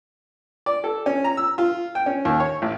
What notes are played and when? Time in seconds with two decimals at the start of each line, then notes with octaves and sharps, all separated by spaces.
0.66 D5
0.84 A4
1.06 C#4
1.24 A#5
1.37 E6
1.58 F4
1.95 G5
2.06 C#4
2.25 D#2
2.40 C#5
2.62 A1